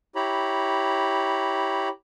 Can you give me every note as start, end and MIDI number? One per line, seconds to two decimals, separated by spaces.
0.16 1.89 64
0.16 1.89 67
0.16 1.89 73
0.16 1.89 82
0.16 1.89 83